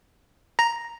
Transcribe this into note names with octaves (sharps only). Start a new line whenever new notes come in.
A#5